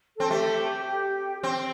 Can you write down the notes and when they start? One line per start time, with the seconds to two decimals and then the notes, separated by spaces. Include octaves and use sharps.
0.16 C4 A4
0.30 A3 G4
0.86 G4
1.43 C4